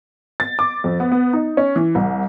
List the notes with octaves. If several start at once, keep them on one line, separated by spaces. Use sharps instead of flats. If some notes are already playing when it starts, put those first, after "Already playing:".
A6
D6
F2
B3
B3
D#4
C#4
E3
C2